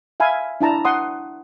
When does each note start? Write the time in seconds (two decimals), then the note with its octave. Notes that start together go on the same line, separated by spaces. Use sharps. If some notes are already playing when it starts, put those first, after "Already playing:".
0.20 E5 F5 G#5 B5
0.61 D4 E4 A5 A#5
0.85 F#5 C6 D#6